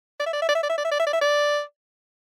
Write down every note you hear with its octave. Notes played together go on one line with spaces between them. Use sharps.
D5
E5
D5
E5
D5
E5
D5
E5
D5
E5
D5
E5
D5
E5
D5